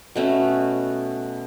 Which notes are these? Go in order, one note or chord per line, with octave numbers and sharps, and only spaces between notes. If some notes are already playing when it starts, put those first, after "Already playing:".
B2 A3 C#4